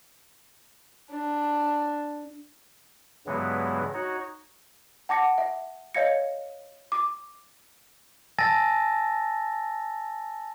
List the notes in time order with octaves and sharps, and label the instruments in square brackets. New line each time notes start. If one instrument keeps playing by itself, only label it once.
[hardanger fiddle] D4
[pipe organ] G2 C#3 E3 F#3 G#3 B3
D#4 F#4 C#5
[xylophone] F#5 A5 D6 A#6 C#7
E5
C#5 D#5 F5 G#6 A#6 C#7
D6
[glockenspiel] G#5 A5 E6 A6 A#6